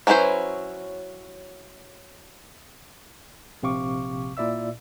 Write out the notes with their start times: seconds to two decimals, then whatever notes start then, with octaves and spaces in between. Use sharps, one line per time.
0.07 F#3 C#4 E4 B4 C5
3.63 A#1 C3 C4 F5 C#6 D6
4.37 A#2 E4 D5 E5 E6